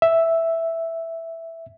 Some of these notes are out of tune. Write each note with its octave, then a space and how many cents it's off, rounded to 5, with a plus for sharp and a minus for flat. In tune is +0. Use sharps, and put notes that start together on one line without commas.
E5 +0